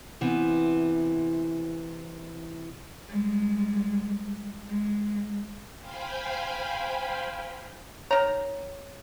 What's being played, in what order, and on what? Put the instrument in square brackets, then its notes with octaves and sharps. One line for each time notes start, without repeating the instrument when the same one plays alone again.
[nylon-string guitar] C3 E3 B3
[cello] G3 G#3
G#3
[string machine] C5 F5 G5 G#5 B5
[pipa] D#3 A#5 [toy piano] C#5